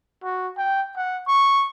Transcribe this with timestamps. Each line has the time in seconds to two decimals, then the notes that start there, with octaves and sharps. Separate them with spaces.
0.24 F#4
0.58 G5
0.97 F#5
1.28 C#6